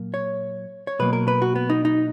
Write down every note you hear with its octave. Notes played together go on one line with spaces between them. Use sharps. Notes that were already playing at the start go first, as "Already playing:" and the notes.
Already playing: A#2 F#3 A#3
C#5
C#5
B2 F#3 A#3 B4
A#4
B4
F#4
B3
D#4
D#4